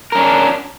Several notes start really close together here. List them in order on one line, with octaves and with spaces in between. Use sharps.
A#4 C#4 D4